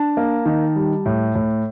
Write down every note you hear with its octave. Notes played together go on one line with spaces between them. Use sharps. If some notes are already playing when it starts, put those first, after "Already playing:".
Already playing: D4 A5
A#3
D#3
G3
A2
A2